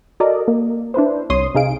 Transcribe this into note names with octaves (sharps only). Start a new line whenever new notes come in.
F#4 A4 A#4 D5 D#5
A#3
D4 E4 B4 C5
C2 C#5 C6 D#6
C3 D#4 G#4 F5 D7